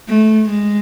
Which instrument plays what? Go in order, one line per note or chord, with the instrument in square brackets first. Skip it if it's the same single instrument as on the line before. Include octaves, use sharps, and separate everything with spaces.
[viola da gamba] A3
G#3